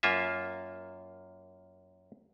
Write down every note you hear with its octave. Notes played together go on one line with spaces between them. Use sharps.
F#2 A#3 F4 E5